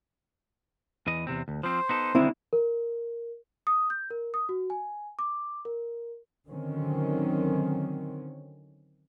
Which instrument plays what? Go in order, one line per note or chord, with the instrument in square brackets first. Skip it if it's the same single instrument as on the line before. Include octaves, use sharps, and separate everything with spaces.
[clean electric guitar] E2 E3 D#5
E2 C3 C4
D2
[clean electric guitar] F3 C4 [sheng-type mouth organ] C5
[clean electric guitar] B3 D#4 A4
[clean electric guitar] D3 D#3 G#3 [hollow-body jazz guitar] C4 E4
[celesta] A#4
D#6
G6
A#4
D#6
F#4
G#5
D6
A#4
[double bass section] D3 D#3 F#3 C4 C#4